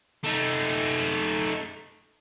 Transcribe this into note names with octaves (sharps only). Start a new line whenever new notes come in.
A3 D#4